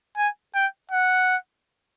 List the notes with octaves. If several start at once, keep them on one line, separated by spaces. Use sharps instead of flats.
G#5
G5
F#5